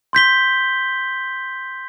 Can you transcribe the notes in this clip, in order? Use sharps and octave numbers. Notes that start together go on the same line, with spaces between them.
C6 G6 B6 G7